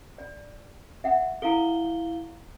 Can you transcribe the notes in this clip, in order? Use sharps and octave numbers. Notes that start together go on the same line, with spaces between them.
D5
E5 F#5
E4 A4 F5 A#5 G7